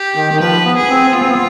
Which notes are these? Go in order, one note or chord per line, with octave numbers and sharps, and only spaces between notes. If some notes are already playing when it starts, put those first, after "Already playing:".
Already playing: G4
D#3
D#3
F3 B4
B3
G#4
C4
B3 F4
C4
B3